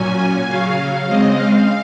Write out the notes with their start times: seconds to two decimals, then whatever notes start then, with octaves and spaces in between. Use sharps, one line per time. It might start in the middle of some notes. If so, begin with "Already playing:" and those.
Already playing: A#2 F#3 C#4 G#5
0.47 C#3 F#3 C#4 F5
1.06 C#3 G#3 C4 D#5
1.35 F5